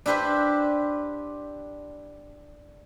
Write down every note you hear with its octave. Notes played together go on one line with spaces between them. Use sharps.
D4 E4 G4 B4 C5 E5